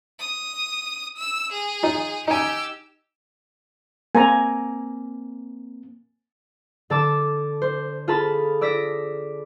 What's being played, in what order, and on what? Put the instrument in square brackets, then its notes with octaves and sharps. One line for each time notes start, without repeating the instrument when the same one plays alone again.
[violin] D#6
E6
G#4
[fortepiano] D#4 F4
[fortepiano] D#4 G#5 [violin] G4 E6
[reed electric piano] A#3 C4 [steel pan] G#5 A#5
[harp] D3 A4 A5 D6 E6 E7
C5
F4 G#4 A4 A5 B5
D5 E6 A#6 B6 D7